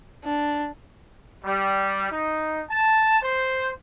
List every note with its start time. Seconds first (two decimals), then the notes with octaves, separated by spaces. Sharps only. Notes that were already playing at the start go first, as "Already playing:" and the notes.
0.25 D4
1.44 G3
2.11 D#4
2.70 A5
3.22 C5